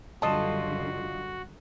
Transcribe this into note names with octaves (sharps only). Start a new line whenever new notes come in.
F#2 D3 G3 F4 F#4 D#5 A5